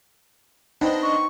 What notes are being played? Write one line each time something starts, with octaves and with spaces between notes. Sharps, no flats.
B3 C4 D4 D#4 D#5
C#6